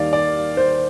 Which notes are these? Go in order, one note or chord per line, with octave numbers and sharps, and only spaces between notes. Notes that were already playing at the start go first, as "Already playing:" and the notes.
Already playing: D#2 D#3 G3 D5 F5
D5
C5